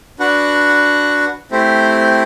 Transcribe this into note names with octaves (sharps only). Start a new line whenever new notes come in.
D4 F#4 B4 F#5
A3 C4 E4 G4 C5